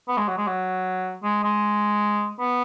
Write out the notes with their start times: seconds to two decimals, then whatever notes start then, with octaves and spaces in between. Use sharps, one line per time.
0.08 B3
0.18 G#3
0.28 F#3
0.37 G#3
0.47 F#3
1.24 G#3
1.43 G#3
2.39 B3